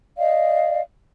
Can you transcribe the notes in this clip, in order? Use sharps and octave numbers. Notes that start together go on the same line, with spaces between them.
D5 D#5 F5